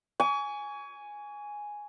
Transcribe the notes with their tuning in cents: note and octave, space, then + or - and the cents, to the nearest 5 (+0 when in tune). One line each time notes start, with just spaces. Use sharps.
G#5 +0 C#6 +35